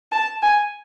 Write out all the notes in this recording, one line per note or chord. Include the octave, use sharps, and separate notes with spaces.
A5
G#5